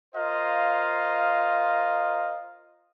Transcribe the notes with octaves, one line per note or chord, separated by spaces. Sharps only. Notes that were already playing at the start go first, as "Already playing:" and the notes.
F4 A#4 C5 D#5 F5